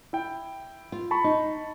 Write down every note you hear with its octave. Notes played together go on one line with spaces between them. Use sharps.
E4 G5
F4
A5 B5 C#6
D#4